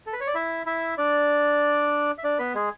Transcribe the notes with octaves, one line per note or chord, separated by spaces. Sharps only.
A4
B4
C#5
D5
E4 E5
E4 E5
D4 D5
E5
D4 D5
B3 B4
G#3 G#4